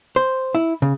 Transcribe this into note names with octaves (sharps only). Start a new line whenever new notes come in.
C5
E4
C#3